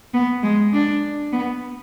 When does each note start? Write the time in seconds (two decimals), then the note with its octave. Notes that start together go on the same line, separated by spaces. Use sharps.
0.14 B3
0.43 G#3
0.73 D4
1.33 B3